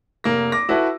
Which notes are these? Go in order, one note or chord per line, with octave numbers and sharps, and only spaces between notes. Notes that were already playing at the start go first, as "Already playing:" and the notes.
F1 A#3 A#6
D6 A#6
E4 F#4 A4 B4